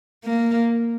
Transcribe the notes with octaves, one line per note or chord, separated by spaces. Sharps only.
A#3